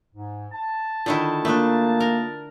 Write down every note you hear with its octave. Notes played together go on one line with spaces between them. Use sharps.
G#2
A5
D3 D#3 E4 F4
A3 A#3 D4 F4 D#6
A#4